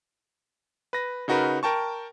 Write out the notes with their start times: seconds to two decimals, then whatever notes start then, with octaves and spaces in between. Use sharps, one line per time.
0.93 B4 A#6
1.28 C#3 D#4 F#4 A#4 B4
1.63 A#4 G5 A5 C#6